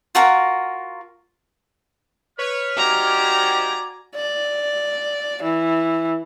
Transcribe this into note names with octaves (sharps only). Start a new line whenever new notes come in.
F4 F#4 A#4 A#5
B4 C#5 F6
D#4 F#4 G4 C5 D5 G#5 A#5
D5
E3